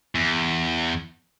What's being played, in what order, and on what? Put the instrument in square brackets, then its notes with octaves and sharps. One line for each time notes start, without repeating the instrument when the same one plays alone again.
[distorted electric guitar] E2